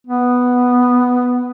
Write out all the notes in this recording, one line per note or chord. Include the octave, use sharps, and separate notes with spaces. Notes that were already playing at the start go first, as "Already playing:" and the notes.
B3